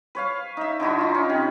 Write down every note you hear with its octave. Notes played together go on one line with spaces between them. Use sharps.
B4 C#5 F5
D#4 E5
D3 D#4 E4 F#4
D#4 F4
C#4
C3 B5